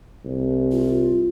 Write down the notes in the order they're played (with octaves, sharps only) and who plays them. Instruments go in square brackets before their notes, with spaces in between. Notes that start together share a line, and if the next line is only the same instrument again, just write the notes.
[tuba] C2
[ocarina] F4